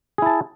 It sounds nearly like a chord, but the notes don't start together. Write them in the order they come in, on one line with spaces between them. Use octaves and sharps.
G#4 E4 A5